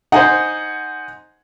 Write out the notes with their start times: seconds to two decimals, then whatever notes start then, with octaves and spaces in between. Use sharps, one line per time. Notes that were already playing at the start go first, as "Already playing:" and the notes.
0.12 D#4 C5 F#5 G#5